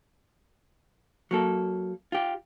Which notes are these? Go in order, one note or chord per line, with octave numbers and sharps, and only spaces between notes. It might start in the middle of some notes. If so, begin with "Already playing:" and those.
F#3 A#3 A4
F4 G4